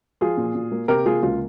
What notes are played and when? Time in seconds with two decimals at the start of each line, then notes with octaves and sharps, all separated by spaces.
0.21 F3 F4 G#4
0.37 A#2
0.55 A#2
0.72 A#3
0.88 C3 G4 A#4
1.06 A#3 F4 G#4
1.23 C#2 F4